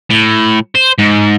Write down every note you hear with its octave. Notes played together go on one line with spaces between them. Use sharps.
A2
C5
G#2